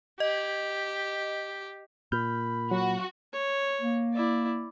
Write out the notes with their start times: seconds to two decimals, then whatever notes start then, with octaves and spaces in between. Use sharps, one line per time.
0.20 G4 D#5
2.12 A#2 B5 F6 G6
2.71 F#3 F#4
3.33 C#5
3.81 A#3
4.14 E4 D5